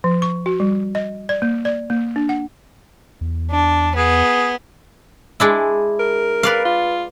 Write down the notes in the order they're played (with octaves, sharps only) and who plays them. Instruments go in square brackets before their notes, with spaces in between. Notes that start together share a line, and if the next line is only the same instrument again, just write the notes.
[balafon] F3
C#6
F#4
G3
D#5
D5
A#3
D5
A#3
D4
F#5
[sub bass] E2
[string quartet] D4
[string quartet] B3 [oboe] G#4
[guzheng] G#3 D4 E4
[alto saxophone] A#4
[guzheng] B4 D5 F5
[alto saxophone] F4